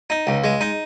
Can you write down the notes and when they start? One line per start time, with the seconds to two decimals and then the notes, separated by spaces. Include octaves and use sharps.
0.10 D#4
0.27 C#2
0.44 G#3
0.61 D#4